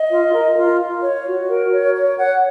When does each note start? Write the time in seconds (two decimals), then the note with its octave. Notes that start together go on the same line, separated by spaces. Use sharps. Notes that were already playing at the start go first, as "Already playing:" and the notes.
Already playing: D#5
0.09 F4
0.32 A#4
0.55 F4
0.79 F4
1.03 C#5
1.26 F#4
1.48 A#4
1.71 C#5
1.95 C#5
2.18 C#5 F#5